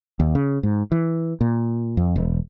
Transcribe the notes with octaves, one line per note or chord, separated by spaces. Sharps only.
D#2
C#3
G#2
E3
A#2
F2
E1